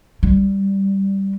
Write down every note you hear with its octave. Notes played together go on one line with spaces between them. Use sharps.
G3